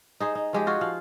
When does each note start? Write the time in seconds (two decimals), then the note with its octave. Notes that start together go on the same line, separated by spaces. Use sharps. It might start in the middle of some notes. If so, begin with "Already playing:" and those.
0.20 D#4 G#4 C5
0.35 D#4
0.53 F3 G#3 G4
0.67 F4 F#4 G#4
0.81 F3 F5